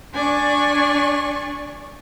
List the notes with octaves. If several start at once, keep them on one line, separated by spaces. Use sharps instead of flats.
D4 D5 G#5 C#6